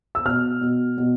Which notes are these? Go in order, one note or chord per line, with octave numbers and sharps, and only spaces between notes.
E6
B2 F6
B2
B2